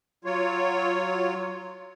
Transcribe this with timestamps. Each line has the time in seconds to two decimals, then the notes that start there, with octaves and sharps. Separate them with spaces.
0.25 F#3 F4 C#5